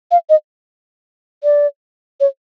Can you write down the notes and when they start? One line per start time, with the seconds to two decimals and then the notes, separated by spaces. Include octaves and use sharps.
0.11 F5
0.29 D#5
1.44 D5
2.20 C#5